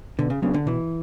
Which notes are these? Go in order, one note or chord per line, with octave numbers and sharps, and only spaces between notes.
B2 D3
C#3
C#3 F#3 B3 D4
D3
B2 E3